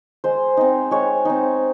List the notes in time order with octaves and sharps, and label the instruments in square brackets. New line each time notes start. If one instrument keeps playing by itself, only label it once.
[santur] G#3 C5
C4 D#4
G#3 C#5
C4 D#4